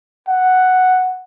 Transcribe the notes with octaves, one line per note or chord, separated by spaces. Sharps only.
F#5